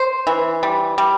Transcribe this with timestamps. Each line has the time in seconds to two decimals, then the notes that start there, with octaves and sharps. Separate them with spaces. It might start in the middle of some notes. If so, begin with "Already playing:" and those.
Already playing: C5
0.27 E3
0.63 G3
0.98 G3